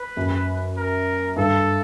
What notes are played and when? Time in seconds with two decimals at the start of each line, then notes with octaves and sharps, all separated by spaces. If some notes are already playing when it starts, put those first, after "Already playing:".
Already playing: B4
0.17 F#2
0.77 A#4
1.36 G2 A4